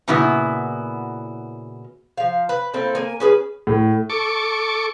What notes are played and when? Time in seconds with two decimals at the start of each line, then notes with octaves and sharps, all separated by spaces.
0.08 A#2 C#3 B3 E4 F#4
2.18 F3 F5
2.49 B4
2.74 A#3 C4 E4 A4
2.95 A#3 G#5
3.20 C#4 G#4 B4
3.67 A2
4.10 A4 C#6 D6